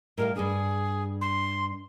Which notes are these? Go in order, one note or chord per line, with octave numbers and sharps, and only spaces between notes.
A2 G3 A#4 F5
G2 D4 G#4
C6